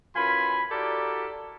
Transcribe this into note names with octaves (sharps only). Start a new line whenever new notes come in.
F#2 E3 F4 G#5 B5
E4 F#4 G4 A4 A#4 D5